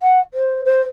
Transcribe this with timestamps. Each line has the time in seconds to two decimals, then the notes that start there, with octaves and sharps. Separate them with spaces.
0.02 F#5
0.33 C5
0.65 C5